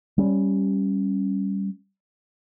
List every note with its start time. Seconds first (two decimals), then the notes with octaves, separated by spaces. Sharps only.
0.18 G3 C#4